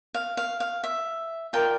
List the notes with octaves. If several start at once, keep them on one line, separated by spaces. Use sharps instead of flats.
F5
F5
F5
E5
F4 A#4 D5 G5